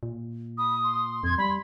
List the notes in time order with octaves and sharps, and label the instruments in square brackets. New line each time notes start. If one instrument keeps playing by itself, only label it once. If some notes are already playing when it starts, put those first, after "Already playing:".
[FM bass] A#2
[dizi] B5 [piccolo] D#6
[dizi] C6
[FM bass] F2 [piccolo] G#6
[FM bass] G3 [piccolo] B5